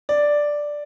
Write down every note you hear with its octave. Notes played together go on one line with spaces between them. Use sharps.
D5